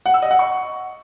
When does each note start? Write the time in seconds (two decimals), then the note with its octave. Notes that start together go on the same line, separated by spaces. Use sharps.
0.06 F#5
0.14 E6
0.22 D#5
0.31 F#5
0.39 C#6